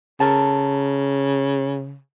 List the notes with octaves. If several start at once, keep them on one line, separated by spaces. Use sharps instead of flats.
C#3 A4 A#4 A5